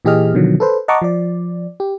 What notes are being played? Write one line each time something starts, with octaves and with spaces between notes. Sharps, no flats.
A#2 E3 G4 G#4 D#5 F6
B2 D3 D#3 F3 F#3
A4 B4 C5
D#5 F#5 A5 A#5 C#6 D6
F3 D5
G4